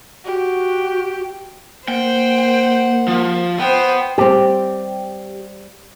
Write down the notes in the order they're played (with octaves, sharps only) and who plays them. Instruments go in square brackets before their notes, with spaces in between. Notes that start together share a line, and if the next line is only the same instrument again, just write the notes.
[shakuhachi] F#4 [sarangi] G4
[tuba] A#3 [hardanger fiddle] C5 F#5 [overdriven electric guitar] G5
[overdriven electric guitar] F3
[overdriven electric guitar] B3 [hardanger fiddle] C5 G5
[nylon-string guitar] G3 C4 [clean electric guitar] G4